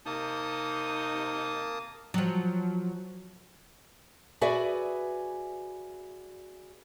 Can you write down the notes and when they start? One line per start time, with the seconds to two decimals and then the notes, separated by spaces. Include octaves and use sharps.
0.06 C3 A#3 D#4 A5 D#6
2.14 F3 F#3
4.41 F#4 G#4 B4 D5 E5